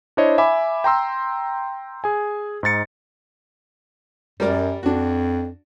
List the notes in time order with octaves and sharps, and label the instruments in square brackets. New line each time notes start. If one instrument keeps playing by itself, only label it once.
[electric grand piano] D4 E4 C5 C#5 D#5
E5 G#5 B5 D6
G5 A#5 C6 E6
G#4 G#5
G#2 D#4 A6 C#7
[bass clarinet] F#2 [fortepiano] G3 A#4 D5
[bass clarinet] F2 [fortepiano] D4 F#4